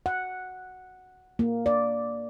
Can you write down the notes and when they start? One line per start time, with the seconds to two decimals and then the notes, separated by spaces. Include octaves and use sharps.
0.06 F#5
1.39 A#3
1.66 D5